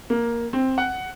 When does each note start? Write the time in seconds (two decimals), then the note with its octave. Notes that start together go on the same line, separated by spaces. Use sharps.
0.10 A#3
0.53 C4
0.78 F#5